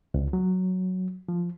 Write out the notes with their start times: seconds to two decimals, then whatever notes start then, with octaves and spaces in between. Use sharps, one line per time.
0.14 C#2
0.33 F#3
1.29 F3